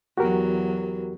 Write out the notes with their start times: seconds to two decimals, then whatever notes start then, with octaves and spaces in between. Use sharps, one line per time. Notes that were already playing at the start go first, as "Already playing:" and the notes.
0.18 E2 F#3 F#4 G4 A#4